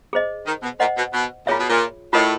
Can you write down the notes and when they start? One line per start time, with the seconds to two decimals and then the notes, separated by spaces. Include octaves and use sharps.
0.13 G#4 C5 D#5
0.46 D#3
0.63 B2
0.80 A#2 C5 D#5 F#5
0.97 B2
1.13 B2
1.47 A#2 F4 G#4 C#5 E5
1.59 B2
1.70 A#2
2.13 A2 F4 A#4 D#5